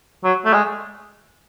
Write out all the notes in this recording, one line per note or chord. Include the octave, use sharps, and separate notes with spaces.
F#3
A3
G#3